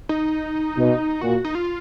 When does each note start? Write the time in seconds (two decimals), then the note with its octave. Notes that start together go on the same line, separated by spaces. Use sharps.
0.09 D#4
0.77 B2
1.21 A#2 F#4
1.45 D#4
1.55 F4